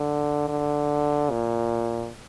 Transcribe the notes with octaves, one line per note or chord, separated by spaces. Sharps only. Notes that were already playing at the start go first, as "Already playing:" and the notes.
Already playing: D3
D3
A#2